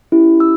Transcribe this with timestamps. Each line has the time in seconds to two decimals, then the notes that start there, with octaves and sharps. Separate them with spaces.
0.12 C#4 E4 G4
0.40 E6